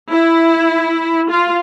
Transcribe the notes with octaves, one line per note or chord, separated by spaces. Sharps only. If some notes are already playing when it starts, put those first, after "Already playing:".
E4
F4